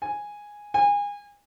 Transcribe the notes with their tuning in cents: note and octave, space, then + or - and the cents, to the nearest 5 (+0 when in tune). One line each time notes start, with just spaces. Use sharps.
G#5 -5
G#5 -30